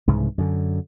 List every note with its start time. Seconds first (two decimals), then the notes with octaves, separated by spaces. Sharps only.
0.07 C2 G#2 C#3 E3
0.38 F#2 D3